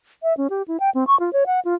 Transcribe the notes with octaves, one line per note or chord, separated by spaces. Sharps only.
E5
C#4
G4
E4
G5
C4
C#6
F4
C#5
F#5
F4